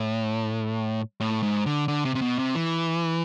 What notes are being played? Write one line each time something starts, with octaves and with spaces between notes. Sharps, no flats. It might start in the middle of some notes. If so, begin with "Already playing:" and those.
Already playing: A2
A2
G#2
D3
D3
C3
C3
B2
C3
E3